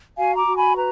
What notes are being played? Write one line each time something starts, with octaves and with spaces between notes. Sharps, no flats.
F#4 F5 G#5
A#5 D6
F#4
G#5 B5
B4 A#5